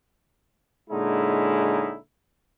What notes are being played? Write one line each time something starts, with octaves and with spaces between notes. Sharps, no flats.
A#2 D3 G#3 C#4 D#4 E4